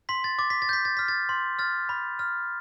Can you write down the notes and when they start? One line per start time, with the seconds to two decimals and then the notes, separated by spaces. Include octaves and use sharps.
0.09 C6 B6
0.24 A6
0.39 D6 A6
0.50 B6
0.62 A6
0.69 G6 B6
0.85 A6
0.97 F6 B6
1.08 A6
1.29 C6
1.59 F6 A6
1.89 B5
2.19 F6